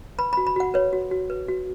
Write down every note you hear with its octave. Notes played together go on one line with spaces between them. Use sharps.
B4 B5
F#4 B5
B5
F#4 F#5
B4 C#5
F#4
F#4
B4
F#4